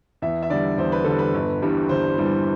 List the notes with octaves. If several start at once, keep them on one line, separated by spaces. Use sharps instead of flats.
E2 E5
E5
D3 G3 D5
E2 C5
B4
D3 G3 A4
B4
G1
G2 E3 G3
G1 C5
G2 E3 G3